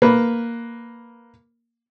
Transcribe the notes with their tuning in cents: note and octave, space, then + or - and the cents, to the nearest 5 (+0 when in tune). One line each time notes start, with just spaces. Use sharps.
A#3 +0 B4 +0